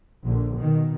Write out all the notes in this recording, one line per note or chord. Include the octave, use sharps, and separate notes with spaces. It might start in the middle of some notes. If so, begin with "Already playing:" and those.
A#1 D3
B2 D#3